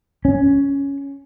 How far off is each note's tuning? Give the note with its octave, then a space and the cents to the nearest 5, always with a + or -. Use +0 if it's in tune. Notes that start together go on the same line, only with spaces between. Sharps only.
C#4 +5